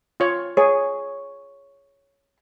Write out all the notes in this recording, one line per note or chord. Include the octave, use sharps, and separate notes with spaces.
F4 C#5
G#4 C#5